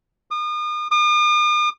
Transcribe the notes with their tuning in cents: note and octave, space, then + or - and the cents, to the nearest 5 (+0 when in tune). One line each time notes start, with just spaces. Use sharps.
D#6 -40
D#6 -45